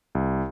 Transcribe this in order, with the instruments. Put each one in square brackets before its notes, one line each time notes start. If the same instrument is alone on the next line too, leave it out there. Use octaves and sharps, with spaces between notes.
[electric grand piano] C2